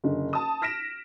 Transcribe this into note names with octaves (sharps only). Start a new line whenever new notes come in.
F#1 D3
A5 D#6
F6 A#6 B6 D7 E7